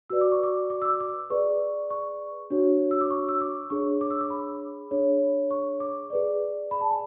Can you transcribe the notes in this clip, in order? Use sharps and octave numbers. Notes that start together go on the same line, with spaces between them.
F#4 B4 D5 E6
D6
C#6
D6
D6
E6
D6
D6
G#4 B4 D5 C#6
C#6
D4 F#4 C#5
E6
D6
C#6
E6
D6
D4 G#4 C#5 C#6
D6
E6
D6
B5
D4 G#4 C#5
C#6
D6
G#4 B4 D5
B5
A5
G#5